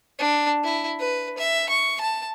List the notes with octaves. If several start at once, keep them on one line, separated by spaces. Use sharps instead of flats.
D4
E4
B4
E5
C#6
A5